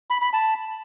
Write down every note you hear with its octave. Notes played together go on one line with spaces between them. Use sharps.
B5
B5
A5